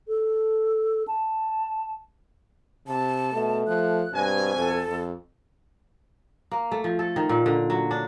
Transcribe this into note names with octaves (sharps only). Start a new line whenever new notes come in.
A4
A5
C3 A5
B2 A3
F3 F#6
G2 B2 C4 G#5
F2 A4
F2
A#3
A3
F3
A4
D#3
A#2
D3
F#3
D4